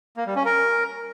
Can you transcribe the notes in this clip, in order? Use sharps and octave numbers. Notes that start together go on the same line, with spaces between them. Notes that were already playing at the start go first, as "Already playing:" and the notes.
A#3
G3
C#4
A#4